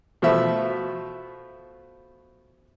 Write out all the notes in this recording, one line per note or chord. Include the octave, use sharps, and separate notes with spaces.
B2 F3 A3 E5